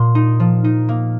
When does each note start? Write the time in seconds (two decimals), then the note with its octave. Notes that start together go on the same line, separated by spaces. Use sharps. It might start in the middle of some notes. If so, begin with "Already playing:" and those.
Already playing: A#2 C6
0.15 D#4
0.40 F3
0.64 D#4
0.89 A#3